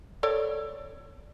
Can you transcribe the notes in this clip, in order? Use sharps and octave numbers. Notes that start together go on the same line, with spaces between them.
A4 C#5 D5